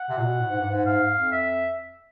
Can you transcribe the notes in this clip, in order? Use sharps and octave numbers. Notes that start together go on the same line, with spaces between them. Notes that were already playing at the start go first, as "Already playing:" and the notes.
Already playing: F#5
C3
A#2
B2
A2
G#2
G2
G#2
G#2 F5
F2
E5